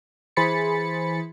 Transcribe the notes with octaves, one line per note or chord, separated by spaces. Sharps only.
E3 G#4 C5 B5 A6 C#7